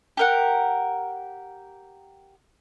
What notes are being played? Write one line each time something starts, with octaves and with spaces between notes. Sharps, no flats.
G4 A#4 F#5